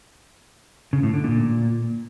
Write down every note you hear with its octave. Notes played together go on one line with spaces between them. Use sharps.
C#3
A2
D3
A#2